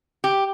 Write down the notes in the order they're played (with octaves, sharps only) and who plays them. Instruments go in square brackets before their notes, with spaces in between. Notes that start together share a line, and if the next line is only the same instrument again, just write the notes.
[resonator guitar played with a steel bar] G4